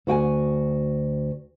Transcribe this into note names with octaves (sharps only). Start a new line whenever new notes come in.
D2 F#4 G5 G#5